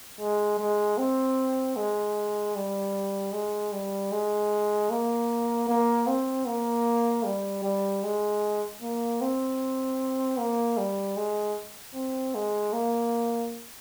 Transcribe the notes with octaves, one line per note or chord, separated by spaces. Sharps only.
G#3
G#3
C4
G#3
G3
G#3
G3
G#3
A#3
A#3
C4
A#3
G3
G3
G#3
A#3
C4
A#3
G3
G#3
C4
G#3
A#3